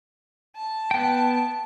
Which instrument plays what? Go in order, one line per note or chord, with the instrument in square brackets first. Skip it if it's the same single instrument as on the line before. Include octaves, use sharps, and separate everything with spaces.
[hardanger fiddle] A5
[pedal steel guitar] B3 G5